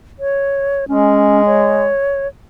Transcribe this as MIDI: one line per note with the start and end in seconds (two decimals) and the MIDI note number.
0.20 0.85 73
0.88 1.90 56
0.88 1.42 61
1.46 2.27 73